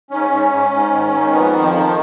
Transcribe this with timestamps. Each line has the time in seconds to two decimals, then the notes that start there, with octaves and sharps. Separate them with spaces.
0.11 G#2 C#4
0.31 G#2
0.51 G#2
0.72 G#2
0.92 D#3
1.12 G#2
1.32 F2 B3
1.53 D#3
1.63 F3
1.72 D#3